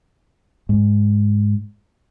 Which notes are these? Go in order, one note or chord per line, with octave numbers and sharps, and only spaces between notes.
G#2